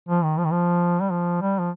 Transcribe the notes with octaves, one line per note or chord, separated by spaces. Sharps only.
F3
D#3
F3
D#3
F3
G3
F3
G3
F3